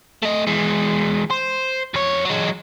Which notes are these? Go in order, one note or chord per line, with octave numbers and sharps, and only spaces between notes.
A3 D#5
E3 G#3
C5
F2 C#5
F#3 G#3